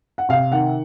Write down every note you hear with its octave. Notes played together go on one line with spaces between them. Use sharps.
F#5
C3 F5
D#3 F#5